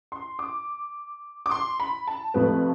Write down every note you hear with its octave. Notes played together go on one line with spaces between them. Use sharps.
C6
D6
D6
C6
B5
A5
F2 C3 F3 A3 B4